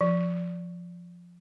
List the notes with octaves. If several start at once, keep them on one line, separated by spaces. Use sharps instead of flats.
F3